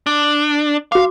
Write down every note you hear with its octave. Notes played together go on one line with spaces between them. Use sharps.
D4
F#4 F5 D6